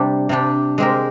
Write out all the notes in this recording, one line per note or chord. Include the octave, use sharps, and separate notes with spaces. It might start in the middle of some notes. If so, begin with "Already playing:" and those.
Already playing: C3 G3 D4 G4
C3 G3 D4 G4
G#3 C4 G4 A#4